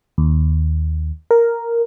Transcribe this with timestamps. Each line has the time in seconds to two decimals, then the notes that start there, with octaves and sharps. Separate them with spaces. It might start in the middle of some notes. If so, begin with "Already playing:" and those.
0.18 D#2
1.31 A#4